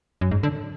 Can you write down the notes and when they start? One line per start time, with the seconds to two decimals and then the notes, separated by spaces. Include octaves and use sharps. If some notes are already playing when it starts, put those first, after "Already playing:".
0.21 F#2
0.31 G#2
0.43 D3